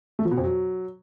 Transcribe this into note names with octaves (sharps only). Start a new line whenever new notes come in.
A3
F3
B2
F2
F#3